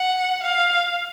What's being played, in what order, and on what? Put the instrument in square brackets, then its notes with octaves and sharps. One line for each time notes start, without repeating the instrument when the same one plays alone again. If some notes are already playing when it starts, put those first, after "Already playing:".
Already playing: [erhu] F#5
F5